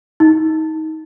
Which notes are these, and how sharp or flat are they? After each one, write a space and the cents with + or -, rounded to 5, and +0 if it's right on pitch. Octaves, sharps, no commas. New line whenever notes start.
D#4 +25